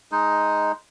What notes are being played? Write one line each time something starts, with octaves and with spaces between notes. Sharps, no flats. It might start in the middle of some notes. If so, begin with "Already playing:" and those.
G#3 D#4